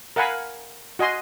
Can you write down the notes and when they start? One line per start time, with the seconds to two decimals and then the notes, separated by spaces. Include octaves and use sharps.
0.16 A#4 F5 F#5 G#5 B5
0.99 F#4 D#5 G#5 C6